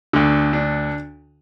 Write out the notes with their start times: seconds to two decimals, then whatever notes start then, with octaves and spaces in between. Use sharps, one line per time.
0.13 D2 D3
0.53 D4